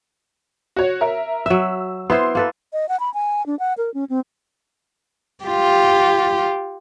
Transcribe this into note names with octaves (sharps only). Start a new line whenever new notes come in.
F#4 C#5
A#4 E5
F#3 E5 E6
B3 E4 C5 C6
A#3 A4 B4
D#5
F#5
B5
G#5
D4
F#5
A#4
C#4
C4
F4 G4